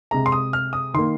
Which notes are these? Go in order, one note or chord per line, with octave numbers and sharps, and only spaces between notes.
C3 G#3 A#5
C6
D#6
F6
D#6
D#3 A#3 C6